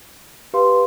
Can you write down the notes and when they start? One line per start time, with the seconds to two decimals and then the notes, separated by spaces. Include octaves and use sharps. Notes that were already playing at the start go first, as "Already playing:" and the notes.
0.54 G4 B4 F5 C6